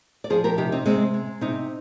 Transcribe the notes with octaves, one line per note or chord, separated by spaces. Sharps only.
D5
F3 G#4 C5
G4 A#4
C3 D#4 G4
C4 D#4
C3 G#3 C4
G#3
C3 C4 D#4